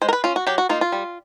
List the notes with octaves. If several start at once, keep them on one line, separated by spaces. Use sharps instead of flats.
G#3 C5
A#4
B4
C#4 F4
F#4
F#3 G4
F#4
A#3 D#4 F4
F4
G3